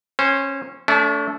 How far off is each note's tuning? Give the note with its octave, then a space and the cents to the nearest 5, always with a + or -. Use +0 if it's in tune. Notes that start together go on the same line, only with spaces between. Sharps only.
C#4 -20 C5 +0
A3 +0 D4 -45